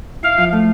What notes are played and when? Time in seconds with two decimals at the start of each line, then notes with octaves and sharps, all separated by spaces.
0.23 E4 F5
0.37 F3
0.53 A3